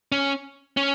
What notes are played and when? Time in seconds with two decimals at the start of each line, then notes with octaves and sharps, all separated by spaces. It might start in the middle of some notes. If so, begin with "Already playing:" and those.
0.12 C#4
0.77 C#4